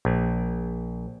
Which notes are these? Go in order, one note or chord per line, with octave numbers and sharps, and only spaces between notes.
A#1